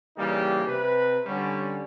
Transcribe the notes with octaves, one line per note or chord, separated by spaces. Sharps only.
C#3 E3 G3 A#3 D#4 G4
C3 B4
D3 G3 C#4